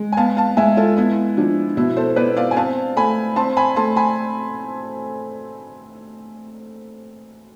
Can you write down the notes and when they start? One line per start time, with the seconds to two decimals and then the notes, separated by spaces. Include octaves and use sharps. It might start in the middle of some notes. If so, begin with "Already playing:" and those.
Already playing: G#3
0.12 G#5
0.17 B3 F5 A5
0.37 F5 A5
0.57 G#3 E5 G#5
0.77 F4 A4
0.97 B3 E4
1.37 F3 D4
1.77 B2 E4
1.97 A4 C5
2.16 B3 B4 D5
2.37 D5 F5
2.51 G#5
2.56 C4 F5 A5
2.97 A3 G#5 B5
3.36 C4 A5 C6
3.57 G#5 B5
3.76 A3 A5 C6
3.96 G#5 B5